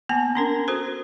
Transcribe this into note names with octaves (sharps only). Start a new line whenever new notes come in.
A#3 B3 A5
C#4 D4 A#4
F#4 A4 C5